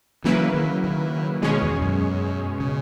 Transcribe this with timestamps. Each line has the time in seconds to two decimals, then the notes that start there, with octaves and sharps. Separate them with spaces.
0.24 C#3 E3 F#3 A#3 E4 B4
0.54 D#3
0.84 D#3
1.42 B2 D#3 G#3 C#4 G#4 C#5
1.62 E2
1.81 F#2
2.60 C#3